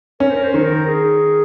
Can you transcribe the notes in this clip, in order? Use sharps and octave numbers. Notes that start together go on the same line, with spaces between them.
C#4 A#4
C5
A#4
C5
D#3
A#4
G#4